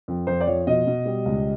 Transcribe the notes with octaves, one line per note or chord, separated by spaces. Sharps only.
F2
F2 C5
D5
F3 C#5
B2 D#5
B2
G3
C#2